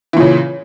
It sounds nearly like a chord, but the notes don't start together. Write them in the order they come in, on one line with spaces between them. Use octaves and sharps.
E3 A#2 C#3